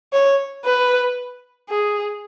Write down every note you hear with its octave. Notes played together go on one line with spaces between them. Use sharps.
C#5
B4
G#4